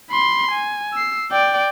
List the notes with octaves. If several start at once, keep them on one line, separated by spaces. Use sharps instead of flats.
B5 C6
G#5
E6 C7
D5 G5